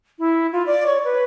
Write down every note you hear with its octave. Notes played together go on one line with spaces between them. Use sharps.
E4
F4
D5
C#5
B4